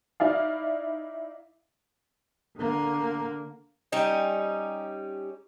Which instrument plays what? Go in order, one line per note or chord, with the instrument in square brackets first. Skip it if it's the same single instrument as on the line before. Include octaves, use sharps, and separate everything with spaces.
[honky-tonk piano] D#4 E4 D5 F5
[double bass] D3 A#3
[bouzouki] G3 C#4 D#4